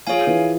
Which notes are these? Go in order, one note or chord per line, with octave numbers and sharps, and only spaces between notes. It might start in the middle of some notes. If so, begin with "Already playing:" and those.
F3 G#4 C#5 F5 G#5
E3